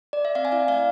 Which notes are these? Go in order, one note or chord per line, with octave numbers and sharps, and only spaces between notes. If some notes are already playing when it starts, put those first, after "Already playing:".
D5
E5
C4 D5 F5
G#5
E4 D5 F5
A3 D5 F5